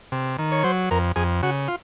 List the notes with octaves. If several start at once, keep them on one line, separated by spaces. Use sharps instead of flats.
C3
D#3
C#5
F#3 C5
F2 A#4
F2 G#4
C#3 F#4
F4